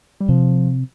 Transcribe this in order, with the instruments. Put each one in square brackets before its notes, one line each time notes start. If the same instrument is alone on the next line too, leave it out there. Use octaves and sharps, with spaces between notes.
[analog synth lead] G3
[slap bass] C3 [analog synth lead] F3